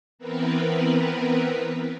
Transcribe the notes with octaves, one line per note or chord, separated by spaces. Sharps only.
E3 B3 C4 A#4 B4